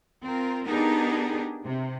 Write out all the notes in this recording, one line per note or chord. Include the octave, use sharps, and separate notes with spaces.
C4 F4 A#4
B3 D4 D#4 G4 G#4 A#4
C3